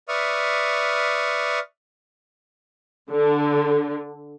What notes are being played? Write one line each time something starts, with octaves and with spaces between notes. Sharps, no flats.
B4 D5 E5 C#6 D#6 F6
D3